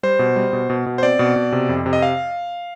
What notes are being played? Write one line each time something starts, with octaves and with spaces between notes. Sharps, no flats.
G3 C5
B2
G3
B2
B2
B2
C5
C4 D5
B2
B2
C3
F2
C3
D#5
F5